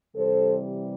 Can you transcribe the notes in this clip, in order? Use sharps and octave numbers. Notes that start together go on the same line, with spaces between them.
C3 E3 G3 A4 C5